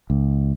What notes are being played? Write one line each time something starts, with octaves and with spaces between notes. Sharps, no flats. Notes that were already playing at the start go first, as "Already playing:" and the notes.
C#2